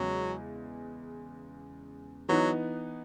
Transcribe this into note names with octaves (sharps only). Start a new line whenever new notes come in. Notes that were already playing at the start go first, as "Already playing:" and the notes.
Already playing: E2 C#3 F#3 G#3
E3 F#3 B3 D#4